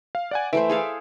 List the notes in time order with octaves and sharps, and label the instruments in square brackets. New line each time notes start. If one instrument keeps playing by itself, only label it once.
[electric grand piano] F5
D5 F#5 G#5
[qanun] E3 A3 C5 [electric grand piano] E5 D7
[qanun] G#4 A4 F5